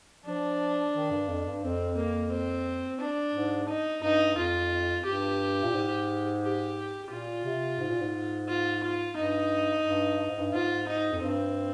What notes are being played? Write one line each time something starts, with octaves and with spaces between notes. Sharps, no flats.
F3 D4
D#3
G2
F2
G2
F2 C4
A#3
C4
D4
G#2
D#4
G2 D#4
F2 F4
G2 G4
A#2
G#2
G4
A#2 F4
C3
G#2
A#2
G#2
F4
F4
G2 D#4
G2
G2
G#2
G2
G#2 F4
D#4
F2
G2 C4